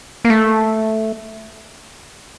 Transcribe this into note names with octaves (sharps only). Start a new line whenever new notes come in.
A#3
A3